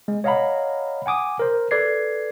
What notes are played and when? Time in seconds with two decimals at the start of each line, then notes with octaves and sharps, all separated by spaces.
0.08 G#3
0.24 C#5 D#5 F5 F#5 A#5 B5
1.06 F#5 G#5 D6 D#6
1.39 A#4 C5
1.71 A4 B4 D5 G#6 C7